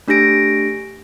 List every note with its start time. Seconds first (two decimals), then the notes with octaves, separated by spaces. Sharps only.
0.08 A3 D4 G4 A#6 D7